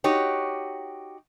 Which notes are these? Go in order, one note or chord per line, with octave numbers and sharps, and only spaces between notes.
D#4 F#4 G4 C#5